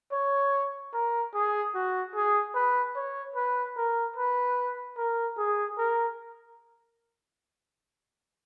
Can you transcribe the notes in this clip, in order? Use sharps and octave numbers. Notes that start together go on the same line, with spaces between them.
C#5
A#4
G#4
F#4
G#4
B4
C#5
B4
A#4
B4
A#4
G#4
A#4